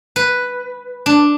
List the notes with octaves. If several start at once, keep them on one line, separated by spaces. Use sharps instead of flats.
B4
D4